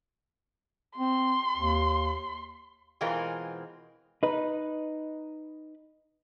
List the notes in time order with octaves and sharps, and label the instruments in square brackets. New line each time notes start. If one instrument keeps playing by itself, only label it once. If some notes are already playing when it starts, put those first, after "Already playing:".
[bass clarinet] C4 [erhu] C6
[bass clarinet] D#2
[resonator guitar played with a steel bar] B2 E3 G#3 C4 F4 A#4
[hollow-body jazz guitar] D#4 B4